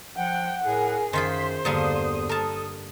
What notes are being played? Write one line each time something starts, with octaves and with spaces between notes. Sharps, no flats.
F3 F#5 G5
A2 G#4 A#4
F#2 D#3 F4 G#4 C5 C6 B6
E2 G2 D3 A#3 D#6
A4 A#4 A5